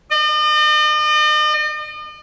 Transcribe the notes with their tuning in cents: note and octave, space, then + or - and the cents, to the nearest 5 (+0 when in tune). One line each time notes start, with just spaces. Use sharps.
D#5 -45